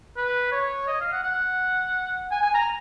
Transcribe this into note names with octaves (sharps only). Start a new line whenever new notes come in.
B4
C#5
D#5
F5
F#5
F#5
G#5
G#5
A#5